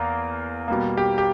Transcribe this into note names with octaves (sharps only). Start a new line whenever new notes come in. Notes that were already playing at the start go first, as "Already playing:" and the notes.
Already playing: E2 A#3 A#4
B2 G3 A#3
G4
G4